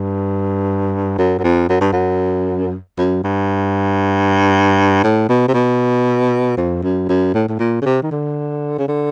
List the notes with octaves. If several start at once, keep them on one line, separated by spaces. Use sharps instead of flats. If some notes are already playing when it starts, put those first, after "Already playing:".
Already playing: G2
F#2
F#2
F2
F#2
G2
F#2
F#2
G2
A2
B2
C3
B2
F2
F#2
F#2
A2
A2
A#2
C#3
C3
D#3
D3
C#3
D3